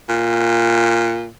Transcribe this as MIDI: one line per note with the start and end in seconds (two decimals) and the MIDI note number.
0.09 1.31 46